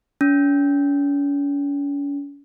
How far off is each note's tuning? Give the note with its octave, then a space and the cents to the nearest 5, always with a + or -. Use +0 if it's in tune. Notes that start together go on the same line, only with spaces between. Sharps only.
C#4 +40